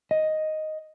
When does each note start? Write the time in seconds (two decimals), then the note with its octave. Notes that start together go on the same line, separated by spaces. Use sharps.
0.11 D#5